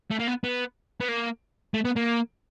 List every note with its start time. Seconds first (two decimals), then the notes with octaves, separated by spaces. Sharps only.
0.11 A3
0.20 A#3
0.28 B3
0.44 B3
1.01 B3
1.09 A#3
1.74 A3
1.85 B3
1.96 A#3